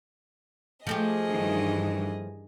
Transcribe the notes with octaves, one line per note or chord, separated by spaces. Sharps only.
F3 A3 G4 G#4 D#5
G2 D#3 E3